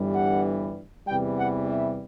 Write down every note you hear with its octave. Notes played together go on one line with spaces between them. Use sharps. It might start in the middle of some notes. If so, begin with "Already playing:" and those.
Already playing: G1 G2 E3 G3
F#5
E2 C3 E3 G3 G5
F#5
E5